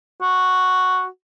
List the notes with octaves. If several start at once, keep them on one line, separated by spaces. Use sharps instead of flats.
F#4